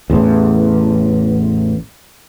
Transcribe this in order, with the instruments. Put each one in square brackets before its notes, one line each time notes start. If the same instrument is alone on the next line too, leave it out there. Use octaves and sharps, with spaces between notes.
[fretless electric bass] A1 E2